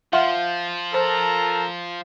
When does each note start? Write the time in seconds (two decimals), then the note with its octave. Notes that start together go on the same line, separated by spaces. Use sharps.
0.13 F3 F4 E5 F#5
0.94 A4 A#4 C5 A#5